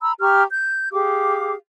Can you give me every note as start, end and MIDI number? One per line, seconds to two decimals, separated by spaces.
0.01 0.13 82
0.01 0.13 83
0.01 0.13 88
0.20 0.43 67
0.20 0.43 82
0.20 0.43 85
0.20 0.43 89
0.51 0.90 91
0.92 1.54 67
0.92 1.54 68
0.92 1.54 77
0.92 1.54 86